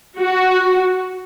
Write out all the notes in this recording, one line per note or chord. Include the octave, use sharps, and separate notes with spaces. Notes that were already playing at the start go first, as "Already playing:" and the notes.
F#4